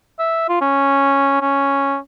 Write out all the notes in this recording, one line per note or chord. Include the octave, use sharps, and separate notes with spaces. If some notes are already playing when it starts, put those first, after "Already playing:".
E5
F4
C#4
C#4